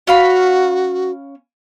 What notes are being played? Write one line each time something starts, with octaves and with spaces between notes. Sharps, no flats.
C#4 F#4 F5 B5